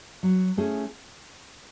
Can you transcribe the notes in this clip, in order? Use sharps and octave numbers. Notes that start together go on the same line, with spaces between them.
F#3
A3 C#4 E4 G#4